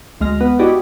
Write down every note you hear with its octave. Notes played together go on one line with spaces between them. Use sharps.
D2 G#3 F6 A#6
B3
E4 F#4 G4 D5 D#5